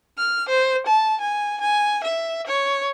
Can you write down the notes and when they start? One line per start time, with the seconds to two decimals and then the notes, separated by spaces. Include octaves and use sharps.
0.18 F6
0.49 C5
0.86 A5
1.21 G#5
1.61 G#5
2.04 E5
2.47 C#5